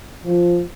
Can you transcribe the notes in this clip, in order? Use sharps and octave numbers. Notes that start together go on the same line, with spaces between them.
F3